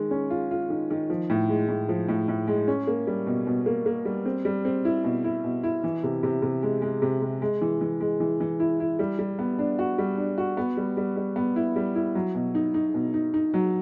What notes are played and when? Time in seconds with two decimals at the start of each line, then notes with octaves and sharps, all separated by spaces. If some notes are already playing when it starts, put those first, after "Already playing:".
Already playing: D#3 G#3
0.11 C#4
0.30 F4
0.51 F4
0.70 D#3
0.90 D#3
1.10 F3
1.30 A2
1.49 G#3
1.68 A2
1.89 F3
2.08 A2
2.28 A2
2.47 G#3
2.68 C#4
2.87 A#3
3.07 G3
3.26 B2
3.47 B2
3.66 A#3
3.86 A#3
4.05 G3
4.25 C4
4.45 G3
4.65 C4
4.85 E4
5.04 B2
5.24 E4
5.44 B2
5.63 E4
5.84 E3
6.03 C3
6.23 C3
6.42 C3
6.62 G#3
6.82 G#3
7.02 C3
7.22 C3
7.42 G#3
7.61 E3
7.81 E3
8.00 G#3
8.20 E3
8.40 E3
8.60 E4
8.80 E4
8.99 G3
9.19 G3
9.39 B3
9.59 D4
9.79 F#4
9.98 G3
10.18 D4
10.38 F#4
10.57 B3
10.77 G3
10.97 G3
11.16 G3
11.36 B3
11.56 E4
11.76 G3
11.95 E4
12.15 F#3
12.35 B2
12.55 D#4
12.74 D#4
12.94 B2
13.14 D#4
13.34 D#4
13.54 F#3